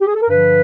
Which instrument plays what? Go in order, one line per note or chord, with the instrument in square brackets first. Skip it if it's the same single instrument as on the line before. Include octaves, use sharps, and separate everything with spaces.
[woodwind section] G4
G#4
A4
A#4
G2 D3 F3 B4